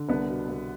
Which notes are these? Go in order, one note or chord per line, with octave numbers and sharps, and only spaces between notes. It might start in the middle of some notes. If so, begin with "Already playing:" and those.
Already playing: D3
C2 B3 D4
B2
C2